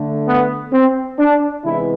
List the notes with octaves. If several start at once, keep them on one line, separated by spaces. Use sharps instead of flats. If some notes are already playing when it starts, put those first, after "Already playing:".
Already playing: D3 A3
B3
C4
D4
C3 E3 G#3 B3 E4